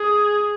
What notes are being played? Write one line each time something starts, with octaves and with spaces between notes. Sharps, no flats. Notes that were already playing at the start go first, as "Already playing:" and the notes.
Already playing: G#4